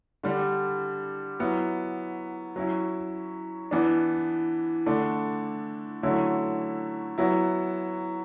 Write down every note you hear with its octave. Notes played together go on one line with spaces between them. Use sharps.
D3 G3 D4
F#3 B3 E4
F#3 C#4 E4
E3 B3 D4
D3 A3 D4
D3 F#3 A3 C#4 E4
F#3 B3 E4